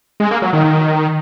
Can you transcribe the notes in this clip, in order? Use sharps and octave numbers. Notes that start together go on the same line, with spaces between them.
G#3
A#3
F#3
D#3
D#3